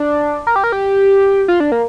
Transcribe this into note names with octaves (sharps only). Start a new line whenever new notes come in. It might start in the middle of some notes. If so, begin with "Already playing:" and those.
Already playing: D4
A#4
G4
A#4
G4
F4
D4
A#3